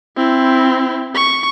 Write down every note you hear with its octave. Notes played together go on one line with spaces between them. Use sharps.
C4 E4
C#6